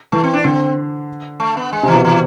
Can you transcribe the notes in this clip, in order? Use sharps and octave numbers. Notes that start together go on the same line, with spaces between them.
E3 A3
C4
D4
D3 C4
A3
B3
G#3
C3
E3
B2
E3